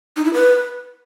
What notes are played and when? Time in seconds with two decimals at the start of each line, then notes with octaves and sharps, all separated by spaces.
0.17 D#4
0.25 E4
0.34 B4